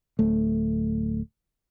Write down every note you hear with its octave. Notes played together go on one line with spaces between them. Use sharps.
D1 A3